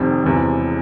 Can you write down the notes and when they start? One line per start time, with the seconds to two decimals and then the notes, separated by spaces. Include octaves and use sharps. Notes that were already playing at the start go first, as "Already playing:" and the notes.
Already playing: F1 F2 C3 D#3
0.24 E1 E2 C3 E3